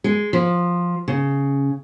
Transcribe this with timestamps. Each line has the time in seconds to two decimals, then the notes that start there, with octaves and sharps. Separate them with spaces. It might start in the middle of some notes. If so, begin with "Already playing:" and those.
0.04 G#3
0.33 F3
1.08 C#3